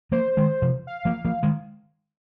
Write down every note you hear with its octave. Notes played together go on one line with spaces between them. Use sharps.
F3 A#3 C5
D#3 G#3
C3 F3
F5
F3 A#3
F3 A#3
D#3 G#3